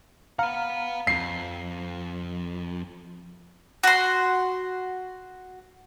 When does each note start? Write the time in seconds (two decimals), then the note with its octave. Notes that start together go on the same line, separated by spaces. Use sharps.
0.39 F5 F#5 A#5 B5 F6
1.07 F2 C7
3.83 F#4 C6